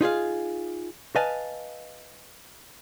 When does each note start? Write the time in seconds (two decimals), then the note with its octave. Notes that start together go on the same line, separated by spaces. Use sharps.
0.01 D#4 F4 G#4 F5
1.15 B4 D#5 F5 G#5 A5